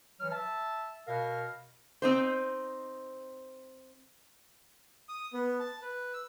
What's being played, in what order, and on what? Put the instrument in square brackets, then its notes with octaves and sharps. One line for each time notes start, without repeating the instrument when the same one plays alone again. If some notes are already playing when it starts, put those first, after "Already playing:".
[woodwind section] E3 F#3 F6
E5 A5
B2 A#4 F5
[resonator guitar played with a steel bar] C4 D#4 C5
[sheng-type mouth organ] D#6
B3
A5
B4
E6